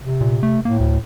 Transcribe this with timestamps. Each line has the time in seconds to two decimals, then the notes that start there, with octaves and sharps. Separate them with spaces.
0.01 C3
0.21 A#2
0.43 A3
0.65 A2 A#3
0.80 D2